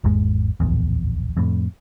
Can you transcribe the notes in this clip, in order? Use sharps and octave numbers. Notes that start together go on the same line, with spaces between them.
G#1 E2 G#2 G#3
D1 A#1 E2
F2 A2